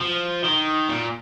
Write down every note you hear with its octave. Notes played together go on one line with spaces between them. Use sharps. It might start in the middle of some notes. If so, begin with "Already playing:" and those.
F3
D#3
A#2